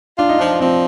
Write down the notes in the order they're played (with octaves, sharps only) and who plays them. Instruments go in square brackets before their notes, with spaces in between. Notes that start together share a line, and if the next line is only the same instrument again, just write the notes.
[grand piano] D4 [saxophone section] F4
[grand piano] D#4
[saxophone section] F3 [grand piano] D4
[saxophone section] F3 [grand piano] C4